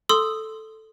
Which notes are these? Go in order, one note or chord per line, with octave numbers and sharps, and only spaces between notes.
A4 C6 D#6 E6